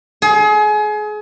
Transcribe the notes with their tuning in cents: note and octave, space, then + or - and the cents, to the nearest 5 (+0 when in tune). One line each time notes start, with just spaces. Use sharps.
G#4 +30